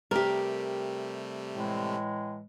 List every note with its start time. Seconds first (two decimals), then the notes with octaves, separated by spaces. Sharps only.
0.11 C3 G3 A3 G4 A#4
1.54 A2 E3 G#3